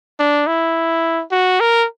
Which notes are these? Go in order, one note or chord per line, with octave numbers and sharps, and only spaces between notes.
D4
E4
F#4
A#4